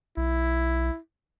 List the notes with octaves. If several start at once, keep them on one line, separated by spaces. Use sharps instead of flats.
B1 E4